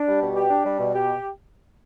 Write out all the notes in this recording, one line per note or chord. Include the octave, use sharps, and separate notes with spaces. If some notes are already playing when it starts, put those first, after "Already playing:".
Already playing: D4
G3
B2
G4
D4
G3
B2
G4